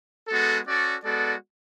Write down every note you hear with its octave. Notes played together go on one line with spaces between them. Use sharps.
G#3 B3 F#4 A4
C#4 F#4 A4 D5
G#3 B3 F#4 A4 D5